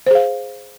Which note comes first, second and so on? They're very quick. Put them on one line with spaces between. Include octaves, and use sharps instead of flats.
C5 G#4 F5